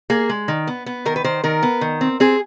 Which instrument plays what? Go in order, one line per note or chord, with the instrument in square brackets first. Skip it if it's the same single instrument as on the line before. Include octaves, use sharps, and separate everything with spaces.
[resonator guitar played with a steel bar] A#3 G#4
G#3
D#3
B3
B3
D#3 A#4
B4
D#3 C5
D#3 A#4
B3
D#3
C4
C4 G#4